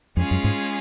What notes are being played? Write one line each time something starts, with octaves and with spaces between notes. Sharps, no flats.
F2 G#3 C#4 F4 G#4
F#2
G#2